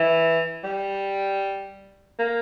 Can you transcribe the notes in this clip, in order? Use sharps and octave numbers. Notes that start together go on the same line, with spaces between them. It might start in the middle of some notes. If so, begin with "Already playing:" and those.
Already playing: E3
G3
A#3